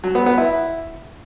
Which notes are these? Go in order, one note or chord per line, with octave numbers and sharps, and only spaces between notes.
F#3
B3
B3
E4